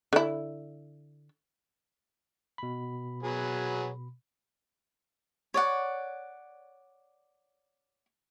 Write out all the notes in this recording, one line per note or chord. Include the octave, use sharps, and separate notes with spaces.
D3 E4
B2 B5
F#3 B3 G#4
C#5 D5 F#5